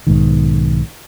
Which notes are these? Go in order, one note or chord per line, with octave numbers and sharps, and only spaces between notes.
B1 G#2 D#3